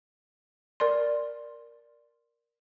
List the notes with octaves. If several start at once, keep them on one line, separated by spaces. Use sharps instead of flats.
A#4 D5 C6